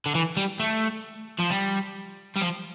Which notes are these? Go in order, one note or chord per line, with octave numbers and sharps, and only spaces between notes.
D3
E3
G3
A3
F3
G3
G3
F3